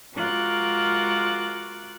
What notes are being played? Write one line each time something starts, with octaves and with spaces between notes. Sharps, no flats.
G#3 F4 F#4 A#4 D6 F#6